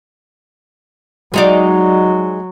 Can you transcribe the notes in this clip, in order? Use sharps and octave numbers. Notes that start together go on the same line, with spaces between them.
F#3 G#3 D#4 D5